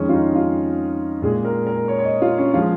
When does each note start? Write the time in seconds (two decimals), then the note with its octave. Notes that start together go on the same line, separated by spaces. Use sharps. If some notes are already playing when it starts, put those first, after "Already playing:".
Already playing: F2 D#3 G#3 C#4
0.09 F4
0.13 D#4
0.36 F4
1.22 A#2 G#3 G#4
1.45 A#4
1.67 A#4
1.88 C#5
1.99 C#5
2.05 D#5
2.22 F4
2.38 C#4
2.54 F3 G#3 F4